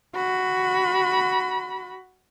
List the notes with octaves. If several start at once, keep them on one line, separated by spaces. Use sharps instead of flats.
F#4 B5